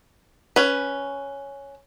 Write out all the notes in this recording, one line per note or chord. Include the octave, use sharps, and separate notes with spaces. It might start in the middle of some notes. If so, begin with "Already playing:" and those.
C#4 B4